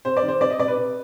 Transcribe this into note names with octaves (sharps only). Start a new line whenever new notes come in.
C3 C5
D5
D#3
C5
C3 D5
D#5
C3 D5
B4
C3